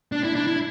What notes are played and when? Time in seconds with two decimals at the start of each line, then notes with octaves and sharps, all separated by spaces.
0.12 D4
0.24 E4
0.35 D4
0.47 E4